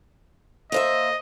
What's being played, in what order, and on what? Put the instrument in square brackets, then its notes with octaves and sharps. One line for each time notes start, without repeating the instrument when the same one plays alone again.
[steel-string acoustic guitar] A#3 C5 E5 [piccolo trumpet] D#5